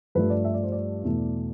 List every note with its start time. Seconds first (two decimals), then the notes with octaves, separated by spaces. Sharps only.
0.15 G2 F3 A3 B4
0.30 D5
0.45 E5
0.54 D5
0.63 C5
0.72 D5
1.03 E2 B2 A3